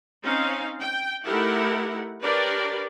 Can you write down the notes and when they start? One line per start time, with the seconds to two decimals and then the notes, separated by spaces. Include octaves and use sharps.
0.23 C4 C#4 D#4 F5
0.80 G5
1.24 A3 D#4 E4 G4 A#4 F#5
2.22 D4 G4 A#4 B4 C#5 D5